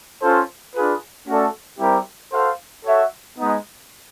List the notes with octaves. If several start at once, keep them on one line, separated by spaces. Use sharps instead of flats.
C#4 F4 A4 C5
D4 F4 G#4 B4
A3 C#4 F#4 A4 D5
G3 C4 E4 G4 A#4
F#4 A4 C5 F5
F#4 A4 C#5 E5
G#3 B3 D#4